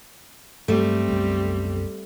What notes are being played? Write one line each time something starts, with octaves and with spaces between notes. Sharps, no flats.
G2 F#3 G3 A3 A#3 C4
C2 F#2 B3